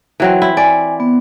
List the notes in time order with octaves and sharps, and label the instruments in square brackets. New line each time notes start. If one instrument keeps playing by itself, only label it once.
[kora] E3 F#3 C4
E4
[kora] D5 [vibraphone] G#5
[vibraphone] B3